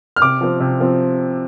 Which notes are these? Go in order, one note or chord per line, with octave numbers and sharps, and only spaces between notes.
F6
C3 D6
F3 C4
C3
F3 C4